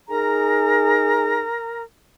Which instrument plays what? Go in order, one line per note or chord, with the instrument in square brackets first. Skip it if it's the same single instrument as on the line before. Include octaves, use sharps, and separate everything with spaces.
[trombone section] D#4 G#4 [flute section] A#4 A#5